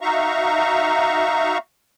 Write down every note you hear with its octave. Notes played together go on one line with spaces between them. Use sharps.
D#4 F#4 E5 F5 A#5 C#6